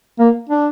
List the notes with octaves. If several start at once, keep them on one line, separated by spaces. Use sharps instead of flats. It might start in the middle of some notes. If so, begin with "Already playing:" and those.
A#3
D4